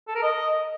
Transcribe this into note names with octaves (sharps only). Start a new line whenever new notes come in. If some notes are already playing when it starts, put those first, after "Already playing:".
A4
A#4
D#5